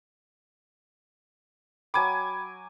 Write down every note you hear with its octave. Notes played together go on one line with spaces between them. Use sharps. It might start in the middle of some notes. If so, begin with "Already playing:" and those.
F#3 G5 G#5 B5 D6